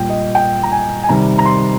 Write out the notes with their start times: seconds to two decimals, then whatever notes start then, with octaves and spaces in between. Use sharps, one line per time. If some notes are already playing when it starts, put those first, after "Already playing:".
Already playing: A#2 G3 G5
0.10 D#5
0.35 G5
0.63 A#5
0.72 G#5
1.04 G#5
1.09 C3 D#3 G3 A#5
1.38 A#5
1.45 C6